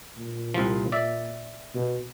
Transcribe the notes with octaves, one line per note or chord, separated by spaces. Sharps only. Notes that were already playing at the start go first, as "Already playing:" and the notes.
A#2
C2 F3
D5 E5
B2